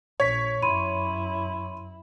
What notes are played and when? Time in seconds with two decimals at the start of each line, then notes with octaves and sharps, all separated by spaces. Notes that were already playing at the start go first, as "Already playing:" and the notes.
0.20 A#1 C#5 G#6 B6
0.62 F#2 E4 B5 C6 D#7